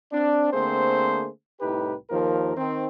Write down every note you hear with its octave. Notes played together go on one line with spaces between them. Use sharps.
C4 D4
D3 A3 A#3 C4 G#4 C5
C2 A2 D#4 G4 B4
D#2 F3 A#4
D#3 C4